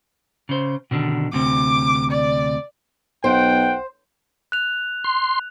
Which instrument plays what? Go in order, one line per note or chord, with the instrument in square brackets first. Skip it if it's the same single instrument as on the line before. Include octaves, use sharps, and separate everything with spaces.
[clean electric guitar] C#3 C5
B2 D3 D#3
[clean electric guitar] D2 C3 [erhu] D6
[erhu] D5
[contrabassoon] B1 [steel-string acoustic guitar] C5 [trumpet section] F#5 G5
[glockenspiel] F#6 F7
[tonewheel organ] C6